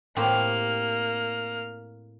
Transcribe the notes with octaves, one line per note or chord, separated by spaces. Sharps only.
A2 A#3 C4 G4 F6